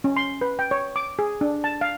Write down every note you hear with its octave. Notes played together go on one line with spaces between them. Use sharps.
C#4
C6
B4
G5
C#5
D6
G#4
D4
A5
F5